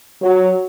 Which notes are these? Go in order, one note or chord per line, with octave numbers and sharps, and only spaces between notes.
F#3